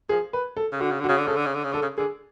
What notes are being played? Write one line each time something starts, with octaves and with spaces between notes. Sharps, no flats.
F3 G#4
B4
A4
C#3
D3 F#4
C#3
D3 F#4
C#3
D3
C#3 A4
D3
C#3
D3
C#3
D3 A4
C#3
D3 G#4